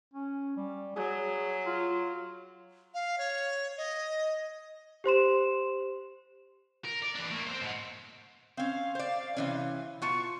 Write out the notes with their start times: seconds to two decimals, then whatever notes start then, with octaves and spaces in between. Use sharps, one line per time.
0.14 C#4
0.56 G3
0.96 F#3 G#4
1.66 F4
2.94 F5
3.18 C#5
3.77 D#5
5.04 G4 C5 C6 E7
6.85 A#4
7.02 D5
7.15 E3 D4
7.31 A3 A#3
7.47 C4 C5
7.61 G#2 B2
8.57 C4 C#4 F5
8.95 C5 D5
9.37 C3 E3 C#4
10.02 B2 F4 A5 C#6